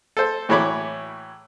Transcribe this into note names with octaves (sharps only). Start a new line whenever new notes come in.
A4 C5
A2 E3 F#3 C#5 B5 D6